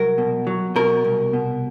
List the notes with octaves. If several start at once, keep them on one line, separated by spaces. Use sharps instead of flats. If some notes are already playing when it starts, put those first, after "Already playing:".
Already playing: C2 F#3 A#4
B2
F#3
B2 A#4
C2
B2